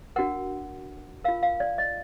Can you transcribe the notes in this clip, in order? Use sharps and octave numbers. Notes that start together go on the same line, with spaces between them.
D4 F#4 A#4 F#5
F4 A#4 F5
F5
D5
D#5